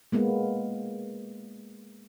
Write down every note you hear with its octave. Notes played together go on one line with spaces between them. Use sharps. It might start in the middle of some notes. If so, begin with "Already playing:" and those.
G#3 A#3 B3